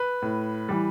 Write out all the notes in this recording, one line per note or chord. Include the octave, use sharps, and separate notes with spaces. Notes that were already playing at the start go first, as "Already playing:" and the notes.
Already playing: B4
A2
E3 G3